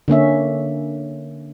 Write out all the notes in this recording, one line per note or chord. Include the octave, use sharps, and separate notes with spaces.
D3 A#3 C#4 E5